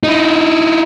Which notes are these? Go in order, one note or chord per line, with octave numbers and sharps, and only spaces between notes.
D#4 E4